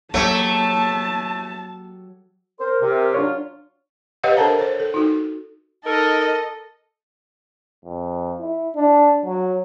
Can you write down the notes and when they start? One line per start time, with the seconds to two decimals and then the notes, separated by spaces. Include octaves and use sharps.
0.14 F#3 A3 A#3 G4 A5
2.60 A#4 C5
2.80 C3
3.14 F#3 D4 F4 C#5
4.23 G4 B4 C#5 D#5 F5 F#5
4.37 D4 A4 A#4 C5 A5 A#5
4.59 C5 C#5
4.80 A4
4.94 D#4 F#4
5.84 D#4 A4 A#4 D#5
7.85 F2
8.40 E4
8.76 D4
9.26 F#3